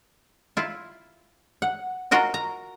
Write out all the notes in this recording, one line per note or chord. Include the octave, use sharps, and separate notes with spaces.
E4 F4
F#5
F4 F#4 A#4 D#5
A#5